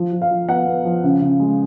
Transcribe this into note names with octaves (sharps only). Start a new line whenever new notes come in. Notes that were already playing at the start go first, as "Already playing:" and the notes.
Already playing: F3
F3
F5
F3
B3 F#5
B3
F3
C#3
C#3
G#3